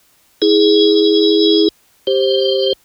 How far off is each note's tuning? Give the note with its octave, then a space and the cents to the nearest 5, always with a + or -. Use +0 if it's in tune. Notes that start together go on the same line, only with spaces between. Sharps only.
E4 -30 G#4 +0
G4 +0 C5 +15